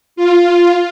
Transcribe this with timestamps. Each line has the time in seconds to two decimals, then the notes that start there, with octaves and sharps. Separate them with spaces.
0.16 F4